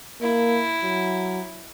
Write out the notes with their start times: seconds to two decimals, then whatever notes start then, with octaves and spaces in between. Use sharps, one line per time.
0.22 A#3 E4
0.83 F#3